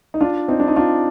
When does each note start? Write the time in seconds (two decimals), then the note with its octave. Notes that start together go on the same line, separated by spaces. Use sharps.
0.14 D#4
0.21 D4 F4
0.48 C4 D#4
0.60 D4
0.68 D#4
0.76 D4 F4